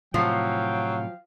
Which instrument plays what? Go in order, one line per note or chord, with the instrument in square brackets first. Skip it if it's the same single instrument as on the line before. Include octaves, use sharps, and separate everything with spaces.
[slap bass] A2 C3 [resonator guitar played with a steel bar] F3 [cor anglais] F#3 [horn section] F5 G5